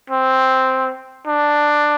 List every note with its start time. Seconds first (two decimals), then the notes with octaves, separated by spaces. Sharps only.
0.10 C4
1.27 D4